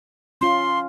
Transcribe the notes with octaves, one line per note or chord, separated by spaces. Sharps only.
C#4 F4 C6